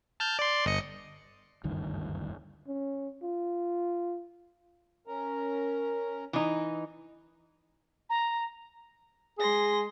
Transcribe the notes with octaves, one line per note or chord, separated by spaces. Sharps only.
A5 F6 G6
D5 C6
G1 D#5 C#7
F#1 D2 G2 D#3
C#4
F4
C#4 A#4 A#5
E3 D#4
A#5
G#3 G#4 C6 A#6